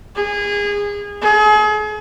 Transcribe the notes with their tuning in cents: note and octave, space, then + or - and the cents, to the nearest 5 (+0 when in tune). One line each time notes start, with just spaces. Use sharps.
G#4 -25
G#4 +40